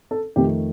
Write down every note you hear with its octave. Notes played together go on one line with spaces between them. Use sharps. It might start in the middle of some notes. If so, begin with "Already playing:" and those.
A4
F2 D#3 A3 G4